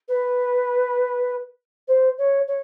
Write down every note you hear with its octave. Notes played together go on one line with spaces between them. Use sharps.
B4
C5
C#5
C#5